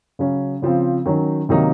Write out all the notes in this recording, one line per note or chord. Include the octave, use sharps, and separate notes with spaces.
C#3 F#3 C#4
C#3 F3 C4
D#3 F#3 C#4
C3 D#3 F#3 A#3 D#4